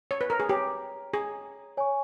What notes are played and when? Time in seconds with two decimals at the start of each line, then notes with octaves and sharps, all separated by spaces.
0.11 C#5
0.21 B4
0.30 A#4
0.40 G#4
0.49 G4 C#5 G5 A#5
1.14 G#4
1.77 C#5 G#5 C#6